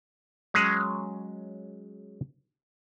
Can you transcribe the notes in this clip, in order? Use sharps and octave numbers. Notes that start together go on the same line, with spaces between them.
F#3 G#3 C#4 G#4